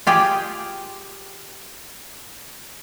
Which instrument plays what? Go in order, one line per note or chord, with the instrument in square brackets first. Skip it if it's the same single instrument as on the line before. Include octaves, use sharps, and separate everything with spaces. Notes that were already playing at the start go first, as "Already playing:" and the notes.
[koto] F4 G4 G#4